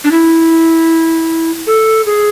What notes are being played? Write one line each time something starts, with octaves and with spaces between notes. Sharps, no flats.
D4
E4
A4
G#4